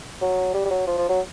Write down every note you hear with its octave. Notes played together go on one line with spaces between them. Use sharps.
F#3
G3
G3
F#3
F3
F3
F#3